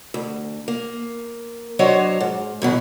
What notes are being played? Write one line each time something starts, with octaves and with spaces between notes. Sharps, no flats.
D2
A#3
F#3 D4 C5 C#5 D#5
G#2
F#2 B2 E3